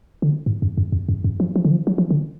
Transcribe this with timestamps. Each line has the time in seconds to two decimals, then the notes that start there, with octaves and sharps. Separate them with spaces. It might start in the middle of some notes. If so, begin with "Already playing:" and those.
0.22 D3
0.46 G#2
0.62 F#2
0.78 F#2
0.92 F2
1.09 F#2
1.24 F#2
1.40 F3
1.56 F3
1.65 D3
1.71 F3
1.87 F#3
1.98 F3
2.10 D3